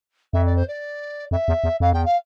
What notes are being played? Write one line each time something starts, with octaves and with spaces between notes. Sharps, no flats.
F2 E5
D5
C5
D5
F2 E5
E2
E2
F2 F5
E2 G5
F5